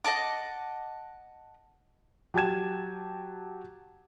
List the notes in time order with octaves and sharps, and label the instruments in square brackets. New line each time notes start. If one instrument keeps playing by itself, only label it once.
[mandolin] D#5 F#5 A5 D6
[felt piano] F#3 G4 G5 A5 G#6 E7